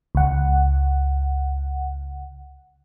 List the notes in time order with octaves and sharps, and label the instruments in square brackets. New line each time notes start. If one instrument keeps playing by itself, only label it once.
[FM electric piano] C#2 F#5